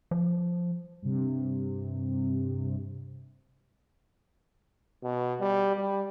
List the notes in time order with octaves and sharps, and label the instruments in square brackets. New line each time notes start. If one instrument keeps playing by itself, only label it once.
[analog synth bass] F3
[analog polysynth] G2 C3
[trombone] B2
G3
G3